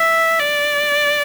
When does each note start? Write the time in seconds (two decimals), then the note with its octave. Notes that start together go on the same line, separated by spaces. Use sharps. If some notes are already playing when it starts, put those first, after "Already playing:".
Already playing: E5
0.39 D5